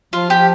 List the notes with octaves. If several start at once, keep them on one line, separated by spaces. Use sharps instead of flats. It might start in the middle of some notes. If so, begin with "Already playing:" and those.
F3 F4
G4